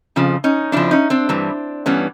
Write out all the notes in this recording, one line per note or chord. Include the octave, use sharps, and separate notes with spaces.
F2 C#3 F3
C#4 D#4
F2 C#3 F3 D4 E4
C#4 D#4
C4 D4
G2 E3 G3
G2 E3 G3 B3 C#4